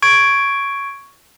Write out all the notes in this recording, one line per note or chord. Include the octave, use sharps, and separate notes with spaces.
C#6 G#6 D7